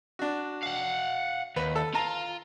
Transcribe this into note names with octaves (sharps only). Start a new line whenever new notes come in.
D4 F#4
F5 F#5
D#2 B4
A4
F4 A5 A#5